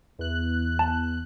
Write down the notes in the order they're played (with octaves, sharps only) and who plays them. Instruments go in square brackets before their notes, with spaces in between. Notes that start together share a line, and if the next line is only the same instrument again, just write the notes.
[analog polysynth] E2 F#6
[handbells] A5